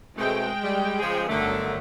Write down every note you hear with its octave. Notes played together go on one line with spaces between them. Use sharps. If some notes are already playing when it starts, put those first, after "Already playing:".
B2 G#3 A3 C4 G5
G3
C#3 F3 G#4
G1 D3 D#3 F#3 A3